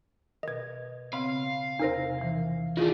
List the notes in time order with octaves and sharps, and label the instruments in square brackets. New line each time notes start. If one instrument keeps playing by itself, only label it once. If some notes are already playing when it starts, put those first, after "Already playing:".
[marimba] B2 A#4 [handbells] D#5 G#6
[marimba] C#3 B3 C4 [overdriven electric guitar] F5 [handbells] B5
[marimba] E2 C3 A#6 [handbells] D#4 A#4 C5
[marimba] E3 F3
[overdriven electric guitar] D#3 D4 [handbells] E4 F4 G#4